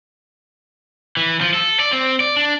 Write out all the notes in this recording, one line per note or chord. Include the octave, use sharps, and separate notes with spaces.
E3
F3
A4
D5
C4
D5
D4